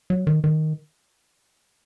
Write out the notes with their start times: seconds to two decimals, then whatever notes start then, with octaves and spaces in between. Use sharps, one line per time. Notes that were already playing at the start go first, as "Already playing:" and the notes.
0.10 F#3
0.27 D#3
0.44 D#3